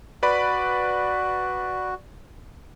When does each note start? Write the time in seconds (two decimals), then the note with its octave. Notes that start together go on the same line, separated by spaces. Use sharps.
0.23 F#4 B4 D5 B5